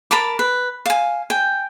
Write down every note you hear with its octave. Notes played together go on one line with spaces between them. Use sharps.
A#4 A5 B5 D6
B4
F5 G#5
G5 G#5